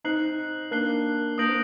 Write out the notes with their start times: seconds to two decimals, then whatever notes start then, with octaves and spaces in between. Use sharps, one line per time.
0.04 C4 D#4 F#6 C7 F#7
0.71 A#3 D4 F#6 C7 G7
1.38 A#3 D4 D#6 G6 A#6 D7 F#7
1.48 C4